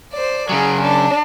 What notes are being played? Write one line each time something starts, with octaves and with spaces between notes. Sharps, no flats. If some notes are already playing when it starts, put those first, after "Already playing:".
C5 D5
C#3 F#3 G#4
D4 D5